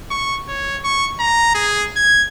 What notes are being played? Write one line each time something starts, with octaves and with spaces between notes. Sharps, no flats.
C#6
C#5
C#6
A#5
G#4
G#6